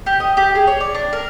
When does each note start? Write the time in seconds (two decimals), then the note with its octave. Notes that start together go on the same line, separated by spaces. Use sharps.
0.06 G4
0.20 D#5
0.37 G4
0.55 G#4
0.67 C#5
0.80 D5
0.94 D4
1.13 A#4